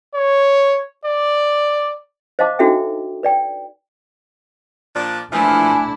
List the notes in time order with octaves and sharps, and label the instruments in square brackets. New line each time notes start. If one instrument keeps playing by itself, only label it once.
[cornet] C#5
D5
[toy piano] C5 D#5 F5 A5 D6
D4 D#4 F#4 A4 E5 G5
B4 D5 G5
[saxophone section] A#2 F3 D4
[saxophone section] A#2 E3 F3 [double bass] A3 D4 [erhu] E4 [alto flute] G#5